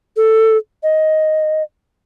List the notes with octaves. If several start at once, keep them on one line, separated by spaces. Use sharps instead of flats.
A4
D#5